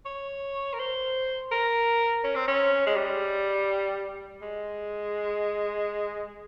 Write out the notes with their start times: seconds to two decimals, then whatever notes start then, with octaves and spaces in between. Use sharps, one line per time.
0.06 C#5
0.73 A#4
0.79 C5
1.52 A#4
2.24 C#4
2.36 C4
2.48 C#4
2.86 G#3
2.97 G3
4.42 G#3